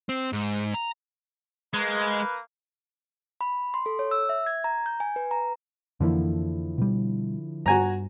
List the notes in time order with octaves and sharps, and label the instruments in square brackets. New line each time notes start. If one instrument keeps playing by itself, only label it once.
[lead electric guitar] C4
G#2
A#5
[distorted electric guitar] G#3 [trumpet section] A#3 B4
[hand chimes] B5
C6
A4
C#5
E6
E5
G#6
A#5
G6
G#5
B4
A#5
[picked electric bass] F2 E3 A#3 [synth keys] D3 F3 E4
[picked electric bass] B2 G3
[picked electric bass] G2 [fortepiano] F#4 G#5 A#5